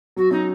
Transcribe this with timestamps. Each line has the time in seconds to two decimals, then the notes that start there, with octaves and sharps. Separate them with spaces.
0.16 F#3 F#4
0.31 C#4 D#4